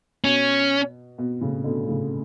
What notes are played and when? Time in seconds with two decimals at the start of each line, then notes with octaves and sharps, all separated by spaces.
0.24 B2 C#4
1.18 B2
1.41 A2 C#3
1.64 B2 D3
1.88 A2 C#3